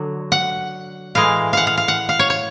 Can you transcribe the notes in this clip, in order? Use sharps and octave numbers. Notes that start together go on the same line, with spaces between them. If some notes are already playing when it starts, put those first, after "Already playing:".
Already playing: D3 F#3
F#5
A2 E3 G#3 F5
F5 F#5
F5
F5
F#5
F5
C#5
C#5